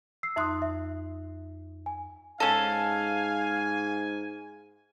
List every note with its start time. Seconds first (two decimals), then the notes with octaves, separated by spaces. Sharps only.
0.23 E6 C7
0.36 F2 D#4 E5 C6 D#6 F#6
0.62 E5
1.86 G#5
2.40 G#2 C#4 A4 F5 G#5